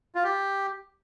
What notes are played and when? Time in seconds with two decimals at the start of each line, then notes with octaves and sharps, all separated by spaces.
0.15 F4
0.24 G4